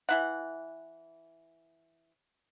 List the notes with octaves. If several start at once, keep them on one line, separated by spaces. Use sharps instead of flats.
E3 E4 F#5